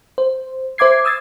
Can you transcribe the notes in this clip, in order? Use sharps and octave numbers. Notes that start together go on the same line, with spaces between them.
C5
C5 E5 D6 G#6 C7
D#6 E6 G#6 A6